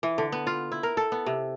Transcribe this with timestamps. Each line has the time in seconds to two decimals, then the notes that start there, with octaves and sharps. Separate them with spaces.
0.03 E3
0.18 D3
0.32 B3
0.47 F4
0.72 E4
0.83 A#4
0.97 A4
1.12 B3
1.26 C3